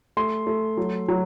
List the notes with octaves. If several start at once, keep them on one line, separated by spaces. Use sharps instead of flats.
A3 C6
A3
F#3
F#3